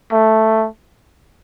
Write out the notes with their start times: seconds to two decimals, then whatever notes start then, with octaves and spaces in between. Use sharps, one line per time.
0.12 A3